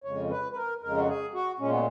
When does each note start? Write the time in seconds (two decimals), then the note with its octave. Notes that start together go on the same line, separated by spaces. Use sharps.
0.04 F2 C#3 G#3 C#5
0.30 B4
0.52 B4
0.56 A#4
0.82 F2 C#3 G#3 A#4
0.97 F#4
1.08 G#4
1.34 F#4
1.59 A#2 G#3 C#4
1.70 B3